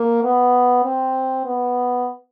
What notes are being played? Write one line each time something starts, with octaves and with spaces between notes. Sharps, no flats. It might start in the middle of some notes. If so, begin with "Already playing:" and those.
Already playing: A#3
B3
C4
B3